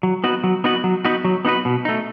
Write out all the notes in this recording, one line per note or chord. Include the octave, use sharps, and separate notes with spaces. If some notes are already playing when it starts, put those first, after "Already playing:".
F#3
B3 D#4 F#4 B4
F#3
B3 D#4 F#4 B4
F#3
B3 D#4 F#4 B4
F#3
B3 D#4 F#4 B4
B2
A3 D#4